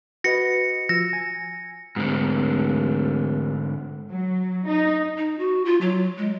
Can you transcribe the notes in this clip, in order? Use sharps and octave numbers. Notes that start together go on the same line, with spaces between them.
F#4 B4 D#5 A#6 C#7
F3 E6 A#6
G#5
D1 G#2 D3
F#3
D#4
D#4
F#4
F4
F#3
G#3